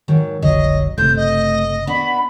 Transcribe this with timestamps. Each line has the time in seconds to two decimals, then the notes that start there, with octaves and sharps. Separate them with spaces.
0.08 G#2 D#3 F#3
0.42 F1 B1 D3 F#3 D#5
0.98 F#1 C3 A3 C5 G6
1.16 D#5
1.87 B3 D4 F#4 B5